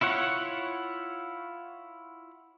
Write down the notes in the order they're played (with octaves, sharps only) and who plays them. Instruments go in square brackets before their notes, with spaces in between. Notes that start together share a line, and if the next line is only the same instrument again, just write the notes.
[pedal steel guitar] E4 F4 C#5 F#5